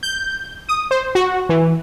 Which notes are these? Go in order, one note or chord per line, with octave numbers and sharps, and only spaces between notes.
G6
D#6
C5
F#4
E3